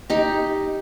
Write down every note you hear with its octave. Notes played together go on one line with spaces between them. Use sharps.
D#4 G4